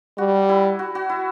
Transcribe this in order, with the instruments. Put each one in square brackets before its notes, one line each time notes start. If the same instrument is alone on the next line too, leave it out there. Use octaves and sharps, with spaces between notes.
[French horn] G3 [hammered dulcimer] F#4
[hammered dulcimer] E4
F#4
F#4
E4